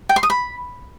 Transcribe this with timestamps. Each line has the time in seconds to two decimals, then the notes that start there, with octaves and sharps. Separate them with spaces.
0.09 G5
0.16 C6
0.23 D#6
0.30 B5